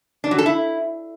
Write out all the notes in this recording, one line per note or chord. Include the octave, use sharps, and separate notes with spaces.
D4
F#3
A4
E4